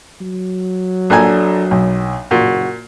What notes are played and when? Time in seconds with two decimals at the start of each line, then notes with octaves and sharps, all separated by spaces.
0.21 F#3
1.10 A#1 D4 A4 G#5 A#5
1.71 B1
2.31 F#1 A#2 F#4